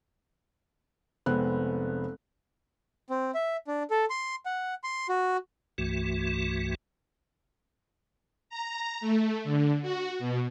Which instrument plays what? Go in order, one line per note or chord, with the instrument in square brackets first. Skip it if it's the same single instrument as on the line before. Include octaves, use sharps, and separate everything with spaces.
[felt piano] F1 G#3 B3 C4 F#6
[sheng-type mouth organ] C4
E5
D4
A4
C6
F#5
C6
F#4
[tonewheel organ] C2 G2 E3 A3 F#4
[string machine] A#5
A3
D3
F#4
B2